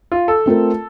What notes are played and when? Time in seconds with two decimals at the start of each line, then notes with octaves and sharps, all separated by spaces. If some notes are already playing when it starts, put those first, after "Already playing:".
0.12 F4
0.28 A4
0.46 A3 C4 F4 A#4